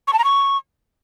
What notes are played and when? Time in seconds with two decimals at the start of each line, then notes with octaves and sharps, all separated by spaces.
0.08 C#6
0.13 A5
0.19 A#5
0.24 C#6